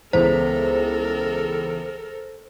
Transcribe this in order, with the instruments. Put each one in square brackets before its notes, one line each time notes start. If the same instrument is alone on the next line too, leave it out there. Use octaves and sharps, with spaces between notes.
[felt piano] C#2 E3 B3 [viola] A4 A#4 [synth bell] C5